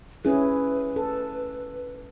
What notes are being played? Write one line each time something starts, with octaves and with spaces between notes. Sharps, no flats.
C#4 E4 G#4 B4
A4